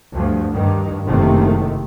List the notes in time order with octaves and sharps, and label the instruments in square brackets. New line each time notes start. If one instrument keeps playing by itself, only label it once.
[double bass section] D2 G2 F3
G2 D#3
F#1 G#2 C3 D#3 A3